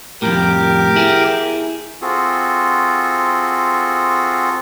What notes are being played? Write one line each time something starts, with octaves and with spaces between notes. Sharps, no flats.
F2 A2 G4 A#4 D6
E4 G#4
C4 F4 F#4 G#4 A4